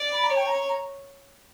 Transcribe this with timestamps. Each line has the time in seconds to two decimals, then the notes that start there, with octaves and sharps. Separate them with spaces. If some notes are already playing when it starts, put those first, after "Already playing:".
Already playing: D5
0.12 B5
0.23 A#5
0.31 C#5 G5
0.46 A#5
0.69 A#5